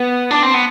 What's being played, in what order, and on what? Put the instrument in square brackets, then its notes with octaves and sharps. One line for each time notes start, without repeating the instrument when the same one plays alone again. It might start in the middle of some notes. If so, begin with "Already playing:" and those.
Already playing: [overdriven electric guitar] B3
D4
C4
B3